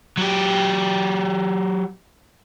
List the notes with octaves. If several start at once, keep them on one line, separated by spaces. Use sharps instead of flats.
F#3 G4